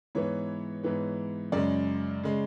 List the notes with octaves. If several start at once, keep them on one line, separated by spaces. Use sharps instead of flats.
G#2 E3 B3 C#5
G#2 E3 B3
F#2 C#3 G#3 D5
C#3 G#3